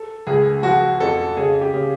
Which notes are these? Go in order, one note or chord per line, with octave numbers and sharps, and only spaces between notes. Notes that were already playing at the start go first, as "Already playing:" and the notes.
Already playing: A4
C#2 G#4
F3 F#4
F2 A4
C#3 G#4
G4
C#3